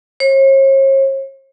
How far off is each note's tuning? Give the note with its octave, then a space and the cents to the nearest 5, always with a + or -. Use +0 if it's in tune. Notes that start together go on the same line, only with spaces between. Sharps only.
C#5 -45